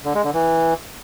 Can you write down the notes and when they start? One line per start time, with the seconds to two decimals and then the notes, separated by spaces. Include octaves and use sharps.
0.05 D3
0.15 G#3
0.24 D3
0.34 E3